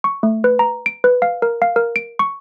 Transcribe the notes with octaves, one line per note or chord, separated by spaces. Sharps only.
C#6
A3
B4
A#5
D7
B4
F5
A#4
F5
A#4
D7
C#6